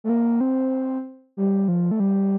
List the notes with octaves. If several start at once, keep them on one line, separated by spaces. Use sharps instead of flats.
A3
A#3
C4
G3
F3
A3
G3